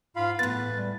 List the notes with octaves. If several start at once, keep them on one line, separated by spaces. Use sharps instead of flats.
G#2 F4 F5 B5
E2 A2 B3 B4 A6
G3